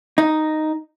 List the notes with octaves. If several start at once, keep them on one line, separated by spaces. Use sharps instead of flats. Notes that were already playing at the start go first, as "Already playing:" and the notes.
D#4